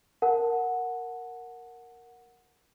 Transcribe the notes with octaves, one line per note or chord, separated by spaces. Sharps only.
A#4 F#5 A5